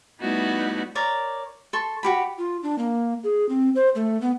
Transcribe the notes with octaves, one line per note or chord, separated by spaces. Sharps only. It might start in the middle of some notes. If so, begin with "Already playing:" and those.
G3 A3 B3 D#4 E4 F#4
A#4 C#5 D5 D6
A4 C6 C#6
F#4 G4 B5
F4
D4
A#3
G#4
C4
C5
A3
B3